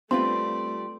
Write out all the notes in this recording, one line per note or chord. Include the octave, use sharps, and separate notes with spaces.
G3 A3 C4 F4 B4 D5 C6